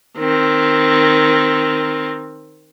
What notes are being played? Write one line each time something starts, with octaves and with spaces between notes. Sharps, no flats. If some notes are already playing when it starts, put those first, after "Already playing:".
D#3 C4